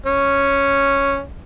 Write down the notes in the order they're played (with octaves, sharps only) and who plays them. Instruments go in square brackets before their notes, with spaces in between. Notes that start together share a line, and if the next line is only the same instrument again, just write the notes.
[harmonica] C#4